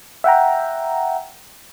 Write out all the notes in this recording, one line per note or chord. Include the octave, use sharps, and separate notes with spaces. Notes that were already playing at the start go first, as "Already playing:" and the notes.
E5 F#5 G5 A#5